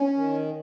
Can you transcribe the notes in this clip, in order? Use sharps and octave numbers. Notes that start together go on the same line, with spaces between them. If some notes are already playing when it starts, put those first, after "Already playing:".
Already playing: C#4
D#3